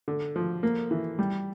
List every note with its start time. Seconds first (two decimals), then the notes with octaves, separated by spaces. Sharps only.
0.08 D3
0.36 F3
0.63 A#3
0.91 E3
1.19 G3